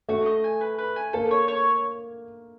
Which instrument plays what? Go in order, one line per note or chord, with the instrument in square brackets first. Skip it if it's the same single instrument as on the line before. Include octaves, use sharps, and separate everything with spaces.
[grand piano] A3 [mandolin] F#4
[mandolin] D#5
G#5
B4
B4
G#5
[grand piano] A#3 [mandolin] A4
[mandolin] C#5
C#5